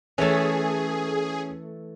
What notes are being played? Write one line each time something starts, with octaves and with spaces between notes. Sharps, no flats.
E3 A3 C#4 G#4 C#5